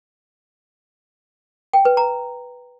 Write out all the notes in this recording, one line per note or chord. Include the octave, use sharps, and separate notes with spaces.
G5
B4
A#5